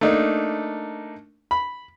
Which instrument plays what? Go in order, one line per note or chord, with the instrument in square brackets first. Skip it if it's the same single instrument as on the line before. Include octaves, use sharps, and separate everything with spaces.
[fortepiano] A3 A#3 D4 D#4
B5